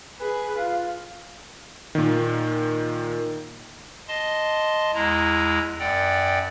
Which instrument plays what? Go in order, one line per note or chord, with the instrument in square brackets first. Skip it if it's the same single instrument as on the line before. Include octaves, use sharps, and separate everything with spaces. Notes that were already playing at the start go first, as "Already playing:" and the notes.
[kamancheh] G#4 B4
F4
[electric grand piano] A#2 D#3
[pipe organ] D#5 A5 C6
E2 G#3 E4 A#5
F#2 D5 F#5 G5